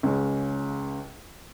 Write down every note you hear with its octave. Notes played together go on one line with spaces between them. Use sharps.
C#2 C#3 G#3 C#4